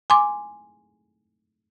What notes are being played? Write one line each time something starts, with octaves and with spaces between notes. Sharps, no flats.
G#5 C6 D6